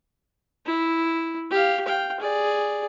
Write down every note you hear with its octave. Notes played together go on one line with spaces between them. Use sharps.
E4
G4 F5
F5 G5
G#4 D5